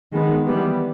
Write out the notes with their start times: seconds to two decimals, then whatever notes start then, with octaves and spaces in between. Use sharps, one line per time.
0.12 D#3 G#3 B3
0.45 E3 G3 B3